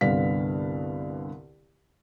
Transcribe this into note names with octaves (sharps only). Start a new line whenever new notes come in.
C2 G2 D3 B3 F5 B6